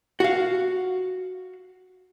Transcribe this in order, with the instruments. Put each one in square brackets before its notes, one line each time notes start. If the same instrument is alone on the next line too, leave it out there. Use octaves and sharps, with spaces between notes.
[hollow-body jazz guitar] F#4 F5